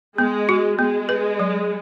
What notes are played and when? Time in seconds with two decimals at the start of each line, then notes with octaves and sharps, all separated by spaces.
0.18 G#3 B3
0.49 F#4
0.79 G#3 B3
1.09 B4
1.39 F#3